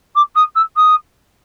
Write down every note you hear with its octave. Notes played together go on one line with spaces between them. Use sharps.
D6
D#6
E6
D#6